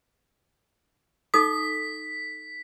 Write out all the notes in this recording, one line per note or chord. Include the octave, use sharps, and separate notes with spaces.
D#4 A4 D#6 B6